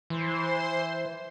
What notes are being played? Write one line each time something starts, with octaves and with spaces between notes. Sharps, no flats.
E3 C5 C6